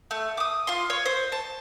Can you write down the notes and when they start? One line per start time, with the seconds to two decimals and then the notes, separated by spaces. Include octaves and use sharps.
0.11 A3
0.37 D6 D#6
0.67 F4 C6
0.90 C#5
1.06 C5
1.32 A5